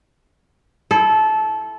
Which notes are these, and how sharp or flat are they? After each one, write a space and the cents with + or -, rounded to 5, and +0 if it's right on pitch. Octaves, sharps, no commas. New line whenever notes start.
E4 +0 A4 -20